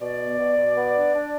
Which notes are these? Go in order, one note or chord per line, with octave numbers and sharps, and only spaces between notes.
B2 D5
B3
B2
B2
B3
D4
D4